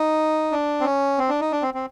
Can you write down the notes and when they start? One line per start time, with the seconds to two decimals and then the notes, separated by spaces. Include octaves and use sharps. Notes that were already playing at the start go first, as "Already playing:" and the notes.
Already playing: D#4
0.52 D4
0.80 C4
0.85 C#4
1.18 C4
1.29 D4
1.41 D#4
1.52 D4
1.62 C4
1.74 C4